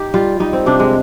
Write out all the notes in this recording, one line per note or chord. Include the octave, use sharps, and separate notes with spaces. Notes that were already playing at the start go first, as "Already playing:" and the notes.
Already playing: D#4 G4
G3 F4
G3 D#4
C4
C3 D4
G#3